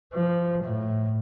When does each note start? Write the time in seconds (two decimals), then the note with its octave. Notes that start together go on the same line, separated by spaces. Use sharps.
0.14 F3
0.63 A2